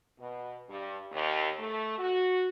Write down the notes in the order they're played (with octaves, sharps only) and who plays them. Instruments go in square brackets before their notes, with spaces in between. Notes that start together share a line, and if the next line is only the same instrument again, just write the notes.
[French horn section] B2
G2
D#2
A3
F#4